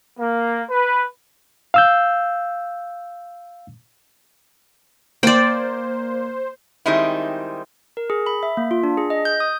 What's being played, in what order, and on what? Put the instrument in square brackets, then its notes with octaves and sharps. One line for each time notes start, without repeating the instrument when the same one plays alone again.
[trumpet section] A#3
B4
[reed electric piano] F5 E6 G6
[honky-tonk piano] A#3 [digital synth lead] C5 [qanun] D5 G5
[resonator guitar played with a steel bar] D#3 G3 G#3 C4 D#4 E4
[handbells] A#4
G#4
B5
E5
A#3
F4
D4
G#4
D#5
G6
D#6